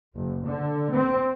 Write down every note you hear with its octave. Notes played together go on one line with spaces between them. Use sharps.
F#1
D3
C4